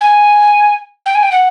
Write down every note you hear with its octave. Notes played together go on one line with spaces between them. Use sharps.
G#5
G5
G#5
G5
F#5